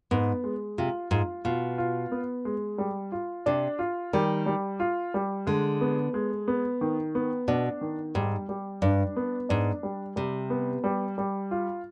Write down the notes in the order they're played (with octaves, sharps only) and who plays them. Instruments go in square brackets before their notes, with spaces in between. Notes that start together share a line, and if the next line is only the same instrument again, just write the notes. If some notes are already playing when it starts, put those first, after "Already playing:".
[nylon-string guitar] G#2 [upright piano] B3
[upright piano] G#3
[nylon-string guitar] C3 [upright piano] F4
[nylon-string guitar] G#2 [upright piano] F4
[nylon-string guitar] B2 [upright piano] F4
[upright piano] F4
B3
G#3
G3
F4
[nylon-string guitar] C3 [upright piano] D4
[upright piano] F4
[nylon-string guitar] D#3 [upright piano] G3
[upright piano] G3
F4
G3
[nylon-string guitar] D3 [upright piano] G#3
[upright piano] B3
G#3
B3
D#3
B3
[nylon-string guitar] B2 [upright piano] D4
[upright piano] D#3
[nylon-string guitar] G#2 [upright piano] G3
[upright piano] G3
[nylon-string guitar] G2 [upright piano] D4
[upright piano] B3
[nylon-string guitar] G#2 [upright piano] D4
[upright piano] G3
[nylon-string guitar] C3 [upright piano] G3
[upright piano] B3
G3
G3
F4